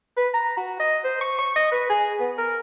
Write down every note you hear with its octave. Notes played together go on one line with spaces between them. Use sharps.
B4
A#5
F#4
D#5
C5
C#6
C#6
D#5
B4
G#4
B3
A#4